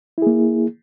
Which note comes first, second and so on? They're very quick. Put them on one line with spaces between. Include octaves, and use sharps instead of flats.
E4 G#4 A#3